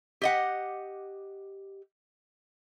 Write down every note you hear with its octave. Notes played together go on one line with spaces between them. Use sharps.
G4 D#5 F#5